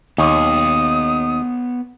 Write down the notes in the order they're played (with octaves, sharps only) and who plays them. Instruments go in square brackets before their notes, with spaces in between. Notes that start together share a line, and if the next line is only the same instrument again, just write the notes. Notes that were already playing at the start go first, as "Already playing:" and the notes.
[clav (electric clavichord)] D#2 [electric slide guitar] B3 C#5 [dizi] D#6